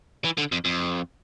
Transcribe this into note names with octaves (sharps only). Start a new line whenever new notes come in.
E3
D3
F2
F2